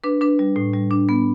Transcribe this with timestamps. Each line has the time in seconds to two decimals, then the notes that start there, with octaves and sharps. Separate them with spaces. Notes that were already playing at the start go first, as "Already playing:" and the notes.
0.04 D4 B4
0.21 D4 B4
0.39 G3
0.56 A2
0.74 G3
0.91 D4
1.09 B3